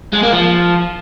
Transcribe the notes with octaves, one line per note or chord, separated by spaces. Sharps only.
G#3
A#3
F3